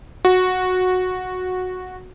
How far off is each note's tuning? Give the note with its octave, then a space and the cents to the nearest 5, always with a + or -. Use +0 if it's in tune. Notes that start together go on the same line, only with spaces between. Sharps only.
F#4 -10